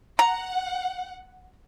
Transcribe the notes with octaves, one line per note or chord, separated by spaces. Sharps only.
F#5 A#5